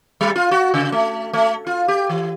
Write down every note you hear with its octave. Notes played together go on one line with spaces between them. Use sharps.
G3
F4
F#4
C#3
A3
A3
F4
G4
E3